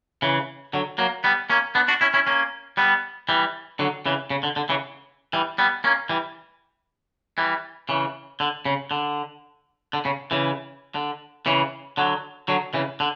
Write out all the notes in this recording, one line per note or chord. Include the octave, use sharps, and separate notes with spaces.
C#3 E3
D3 F#3
F#3 A#3
G3 B3
A#3 C#4
B3 D4
D4 F#4
C#4 E4
C#4 E4
A#3 C#4
G3 B3
E3 G3
D3 F#3
C#3 E3
C#3
D3
D3
C#3 E3
E3 G3
G3 B3
A#3 C#4
E3 G3
E3 G3
C#3 E3
D3
C#3
D3
D3
C#3
C#3 E3
D3
C#3 E3
D3 F#3
D3 F#3
C#3 E3
D3